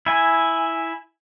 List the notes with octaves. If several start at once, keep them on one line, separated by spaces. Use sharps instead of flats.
E4 G#5